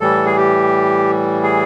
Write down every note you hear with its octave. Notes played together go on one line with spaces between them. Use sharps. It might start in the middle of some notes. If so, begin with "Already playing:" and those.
A2 E3 G3 A4
G#4
G4
G#4